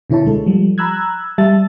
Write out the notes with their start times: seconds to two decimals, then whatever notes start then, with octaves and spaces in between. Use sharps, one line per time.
0.10 B2 D3 E4 C#5 A5
0.25 C#2 G#3 A4
0.46 F3 G3
0.78 A#5 B5 E6 F#6 G#6
1.38 G3 E5 A5 E6 A6